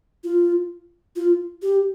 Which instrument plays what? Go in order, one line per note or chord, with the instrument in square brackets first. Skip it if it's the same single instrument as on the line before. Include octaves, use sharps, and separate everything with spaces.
[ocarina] F4
F4
G4